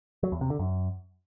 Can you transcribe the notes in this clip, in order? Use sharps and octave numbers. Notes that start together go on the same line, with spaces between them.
F#3
E2
C3
D3
F#2